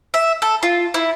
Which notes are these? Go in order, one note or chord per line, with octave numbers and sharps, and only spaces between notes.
E5
A4
F4
E4